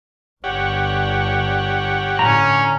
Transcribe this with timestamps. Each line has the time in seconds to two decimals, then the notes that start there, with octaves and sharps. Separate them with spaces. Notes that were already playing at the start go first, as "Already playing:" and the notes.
0.44 G1 D3 G4 C#5 F#5
2.19 A2 D3 C#4 A#5